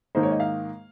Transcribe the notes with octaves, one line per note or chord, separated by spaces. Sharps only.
G#2 D#3 A#3 D#4 C5
C#5
D#5
F5